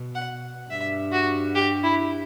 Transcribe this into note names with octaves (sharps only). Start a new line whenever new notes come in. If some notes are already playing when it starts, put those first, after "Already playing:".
Already playing: B2
F#5
G2 E5
F#4
G4
E4